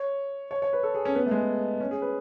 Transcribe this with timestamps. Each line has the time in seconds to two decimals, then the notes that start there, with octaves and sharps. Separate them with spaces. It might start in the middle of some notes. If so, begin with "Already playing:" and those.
Already playing: C#5
0.51 C#5
0.62 C#5
0.73 B4
0.83 A4
0.95 G#4
1.05 C#4
1.15 B3
1.26 A3
1.31 G#3
1.80 C#4
1.91 G#4
2.02 B4